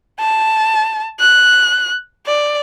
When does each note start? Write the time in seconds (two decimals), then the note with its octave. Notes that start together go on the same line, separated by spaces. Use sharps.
0.20 A5
1.19 F#6
2.26 D5